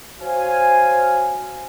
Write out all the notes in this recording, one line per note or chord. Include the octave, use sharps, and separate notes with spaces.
F#4 C5 C#5 F5 G#5